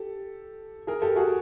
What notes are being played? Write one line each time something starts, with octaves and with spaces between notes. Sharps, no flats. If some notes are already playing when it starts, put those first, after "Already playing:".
Already playing: G4 A4
G#4 A#4
G4 A4
F#4 G#4